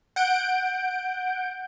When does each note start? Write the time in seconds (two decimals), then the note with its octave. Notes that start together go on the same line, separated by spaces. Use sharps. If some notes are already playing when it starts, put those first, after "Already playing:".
0.16 F#5 G6 D7